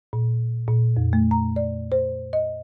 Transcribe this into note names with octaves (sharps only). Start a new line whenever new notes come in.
A#2
A#2
F2
A3
A#5
D5
C5
D#5